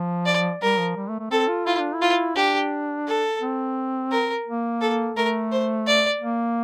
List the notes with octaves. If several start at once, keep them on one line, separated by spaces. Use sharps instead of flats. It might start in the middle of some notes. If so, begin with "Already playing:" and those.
Already playing: F3
D5
G3 A#4
F3
G3
A3
A3
C4 A4
F4
E4 F4
D4
E4
F4
D4 G4
A4
C4
A#4
A#3
A4
A3 A#4
C5
D5
A#3